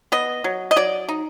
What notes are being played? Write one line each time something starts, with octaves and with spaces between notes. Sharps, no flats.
B3 D#5
F#3
D#5
F#3 D5
D#4